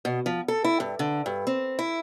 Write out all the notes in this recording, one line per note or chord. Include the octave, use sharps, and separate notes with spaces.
B2
F3
A4
E4
G2
D3
G2
C4
E4